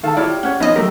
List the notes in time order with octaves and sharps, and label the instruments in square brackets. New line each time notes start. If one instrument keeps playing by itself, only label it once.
[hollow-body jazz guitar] D#3 A4 [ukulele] F5 A5
[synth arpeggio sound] E4 [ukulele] F4 C#5 [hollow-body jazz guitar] G4 D5
[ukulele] C#4 C#5 [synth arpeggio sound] F#5
[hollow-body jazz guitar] F3 B3 [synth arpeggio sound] D#4 D#5
[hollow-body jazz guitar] F#3 A3 G4 [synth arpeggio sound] A#4